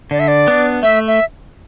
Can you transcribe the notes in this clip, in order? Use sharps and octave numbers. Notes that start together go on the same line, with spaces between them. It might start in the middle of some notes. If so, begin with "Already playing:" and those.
D3 D5
E5
D5
B3 D4
A3 E5
E5